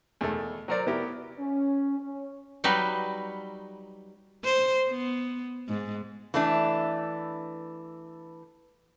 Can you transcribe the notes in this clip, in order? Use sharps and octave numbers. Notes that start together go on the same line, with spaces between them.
E2 B2 D#3 A3
F#3 F#4 A#4 C5 D5
B3 E4 G4 A#4
C#4
C#4
F#3 G3 D#4 B4
C5
B3
G#2
E3 A3 D4